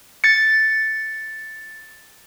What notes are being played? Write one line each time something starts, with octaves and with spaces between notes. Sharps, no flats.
A6 C#7